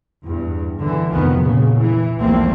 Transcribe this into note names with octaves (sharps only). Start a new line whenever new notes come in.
E2 G2
D3 E3
F1 D2 D#3 F3 B3
A#2 C#3
E3
B1 E2 F3 A3 A#3 C4